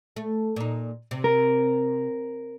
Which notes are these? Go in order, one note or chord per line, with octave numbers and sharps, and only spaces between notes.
A3
A#2 D#4
C3
A#4